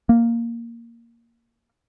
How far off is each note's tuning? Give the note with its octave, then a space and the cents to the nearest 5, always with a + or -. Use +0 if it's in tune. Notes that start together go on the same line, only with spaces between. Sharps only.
A#3 -5